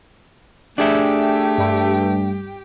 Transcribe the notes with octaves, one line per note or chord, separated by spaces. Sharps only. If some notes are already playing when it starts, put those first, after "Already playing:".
A3 D4 G4 G#4 E5 G5
G2